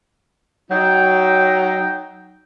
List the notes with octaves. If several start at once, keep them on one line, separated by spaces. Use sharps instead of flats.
F#3 D#4 G5